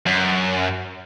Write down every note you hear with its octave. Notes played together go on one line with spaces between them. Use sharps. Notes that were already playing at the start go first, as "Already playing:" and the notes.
F#2